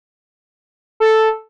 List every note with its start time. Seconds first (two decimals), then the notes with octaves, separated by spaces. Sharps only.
1.00 A4